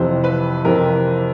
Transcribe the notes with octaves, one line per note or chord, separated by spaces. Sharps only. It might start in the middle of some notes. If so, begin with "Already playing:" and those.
Already playing: F2 C3 E3 C5
B4
F2 C3 E3 A#4